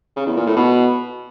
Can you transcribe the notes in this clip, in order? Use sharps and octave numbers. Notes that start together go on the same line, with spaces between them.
C#3
E2
A#2
A2
B2